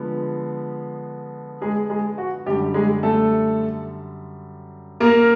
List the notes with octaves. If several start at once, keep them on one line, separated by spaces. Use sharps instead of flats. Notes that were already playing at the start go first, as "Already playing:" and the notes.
Already playing: D3 F3 G#3 B3
G#3 G#4
G#3 G#4
F#4
F#2 D3 G3 G4
G#3 G#4
A3 A4
A#3 A#4